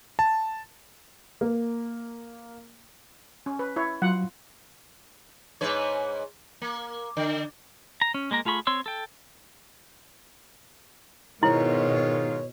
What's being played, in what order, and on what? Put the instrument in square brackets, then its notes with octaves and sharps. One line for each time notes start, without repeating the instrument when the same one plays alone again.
[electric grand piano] A5
[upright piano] A#3
[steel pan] C#4
B4
E4 C#5
[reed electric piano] F#3 [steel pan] F4 F#5
[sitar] G#2 B4 C#5
A#3
D3
[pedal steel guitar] A#5
C#4
G#3 A#3 A#4 A#5
A3 F4 G#4 B5 C#6
C4 C#5 C6 E6
A4 G5
[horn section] G#2 D#3 F4 [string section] B2 [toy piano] E4 [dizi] C#5